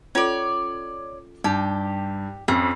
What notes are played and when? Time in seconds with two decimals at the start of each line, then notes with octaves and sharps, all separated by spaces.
0.15 C#4 F4 A4 C#5 D5
1.44 G2 D#4 G4
2.48 F2 C#4